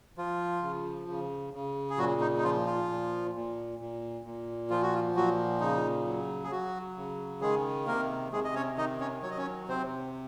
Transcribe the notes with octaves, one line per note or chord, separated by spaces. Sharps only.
F3 F4
C#3
C#3
C#3
G#4
A#2 F#3 F#4
D#4
D#4
F3 F4
F4
A#2
A#2
A#2
A#2
F3 F4
F#4
F4
A#2 F#3 F#4
C#3 D#4
F#3
G#4
F#3 F#4
C#3
D#3 G#3 G#4
C3 A#3 A#4
C3 G#3 G#4
D#5
C#4 C#5
D#3 D#4 D#5
C#4 C#5
F#3 C#5
D#5
C#4 C#5
C3 C4 C5